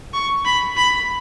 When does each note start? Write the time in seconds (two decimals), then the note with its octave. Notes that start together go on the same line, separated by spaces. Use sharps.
0.14 C#6
0.46 B5
0.77 B5